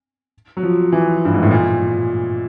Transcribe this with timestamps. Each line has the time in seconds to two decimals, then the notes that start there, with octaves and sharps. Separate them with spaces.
0.57 F#3
0.63 F3
0.92 E3
1.25 G2
1.34 G#2
1.43 A2
1.51 A#2